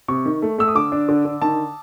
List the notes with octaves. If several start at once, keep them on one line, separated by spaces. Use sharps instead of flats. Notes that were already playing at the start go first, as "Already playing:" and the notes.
C3 C#6
D#3
A3
A3 E6
D#6
D3 D6
D4
D3
D3
D#3 A5